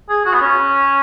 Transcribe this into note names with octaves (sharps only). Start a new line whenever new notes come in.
G#4
F#4
B3
C#4